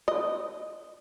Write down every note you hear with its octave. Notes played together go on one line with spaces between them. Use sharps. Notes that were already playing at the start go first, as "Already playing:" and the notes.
D#5